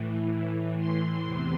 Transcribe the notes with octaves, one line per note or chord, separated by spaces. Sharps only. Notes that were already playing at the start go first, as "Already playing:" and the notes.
Already playing: A2 E3
C6
E2 C3 E3